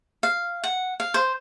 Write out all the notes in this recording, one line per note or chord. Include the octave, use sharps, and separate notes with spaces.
F5
F#5
F5
C5